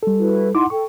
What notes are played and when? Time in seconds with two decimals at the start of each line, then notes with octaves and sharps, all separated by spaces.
0.03 G3 A4
0.18 E4 F#4 B4
0.55 D#4 E4 F#5 C6 D6
0.70 A4 G5 C#6